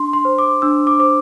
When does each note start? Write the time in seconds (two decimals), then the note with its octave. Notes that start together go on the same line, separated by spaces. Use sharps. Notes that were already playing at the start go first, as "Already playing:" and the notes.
Already playing: D4 C6
0.13 C6
0.25 C5
0.38 D6
0.62 D4 E6
0.87 D6
0.99 C5 D6